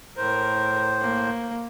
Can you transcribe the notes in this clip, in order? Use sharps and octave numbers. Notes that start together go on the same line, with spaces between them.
A2 A#4 C5
A#3